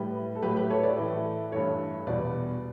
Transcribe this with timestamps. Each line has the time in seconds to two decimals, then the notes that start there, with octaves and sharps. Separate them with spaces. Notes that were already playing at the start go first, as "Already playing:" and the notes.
Already playing: A2 G3 G4 B4
0.35 A4
0.42 A2 F#3 A3 G4 B4
0.56 G4 B4
0.70 A4 C#5
0.83 B4 D5
0.97 A2 E3 A3
1.51 G2 E3 A3 A4 C#5
2.07 E2 B2 G3 B4 D5